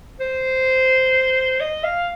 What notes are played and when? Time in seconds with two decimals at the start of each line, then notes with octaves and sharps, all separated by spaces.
0.20 C5
1.61 D#5
1.84 F5